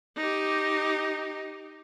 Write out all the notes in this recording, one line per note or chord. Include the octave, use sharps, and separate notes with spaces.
D#4 G4